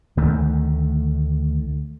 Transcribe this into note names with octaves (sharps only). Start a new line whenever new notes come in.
D2 D#3 A3